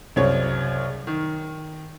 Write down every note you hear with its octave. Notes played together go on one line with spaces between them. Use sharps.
C2 F#2 C#3 C4 C#5
D#3